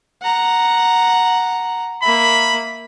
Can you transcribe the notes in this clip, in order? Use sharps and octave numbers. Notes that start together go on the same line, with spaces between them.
F#5 A#5
A#3 E5 B5